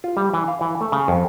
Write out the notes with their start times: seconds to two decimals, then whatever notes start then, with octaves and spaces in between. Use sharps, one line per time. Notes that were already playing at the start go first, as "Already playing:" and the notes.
0.04 F4
0.17 G3
0.34 E3
0.48 F5
0.61 E3
0.81 A3
0.92 C#3
1.08 F2